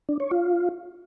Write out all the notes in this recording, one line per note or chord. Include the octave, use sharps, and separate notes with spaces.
D4
C#5
F4